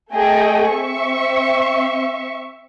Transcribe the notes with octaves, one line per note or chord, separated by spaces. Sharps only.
A3 G#4 A4 D#5 G5
C4 E5 C#6